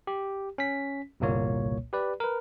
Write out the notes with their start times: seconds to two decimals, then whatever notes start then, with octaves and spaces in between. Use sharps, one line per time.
0.07 G4
0.58 C#4 B6
1.20 G1 C2 A#2 A#3 C#5
1.93 G4 B4 D5
2.20 A#4 B4